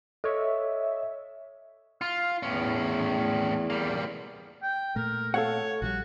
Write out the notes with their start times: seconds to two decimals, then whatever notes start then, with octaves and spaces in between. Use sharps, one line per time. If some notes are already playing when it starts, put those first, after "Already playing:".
0.24 A4 C#5 D#5 E5
2.01 F4 F6
2.43 E2 A2 C#4
3.70 G3 A#3
4.63 G5
4.96 A#2 A3 A#4
5.34 A4 C#5 F5 F#5
5.82 A#1 F3 G3 F#4